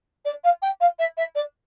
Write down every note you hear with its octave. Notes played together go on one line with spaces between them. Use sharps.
D5
F5
G5
F5
E5
E5
D5